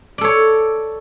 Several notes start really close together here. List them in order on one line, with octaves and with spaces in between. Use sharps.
D5 A4 C#5